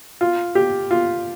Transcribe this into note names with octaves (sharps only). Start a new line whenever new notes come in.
F4
G4
F4